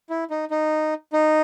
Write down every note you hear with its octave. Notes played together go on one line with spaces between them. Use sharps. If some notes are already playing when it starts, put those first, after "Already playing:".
E4
D#4
D#4
D#4